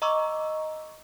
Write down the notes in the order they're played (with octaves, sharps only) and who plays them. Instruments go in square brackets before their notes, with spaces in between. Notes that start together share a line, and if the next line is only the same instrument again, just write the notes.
[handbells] D#5 A#5 C#6 D6 E6